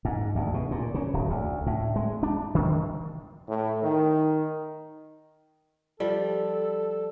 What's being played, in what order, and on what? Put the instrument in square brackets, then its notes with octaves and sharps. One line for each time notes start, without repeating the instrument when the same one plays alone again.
[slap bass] G#2
D2
B2
A#2
C#3
D1
D2
A2
G#3
D4
D#3
[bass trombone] A2
D#3
[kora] F3 G3 [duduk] A4